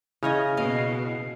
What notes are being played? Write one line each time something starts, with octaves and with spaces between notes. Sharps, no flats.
C#3 C#4 E4 C#5 D#5 F6 G#6
B2 D#5 F5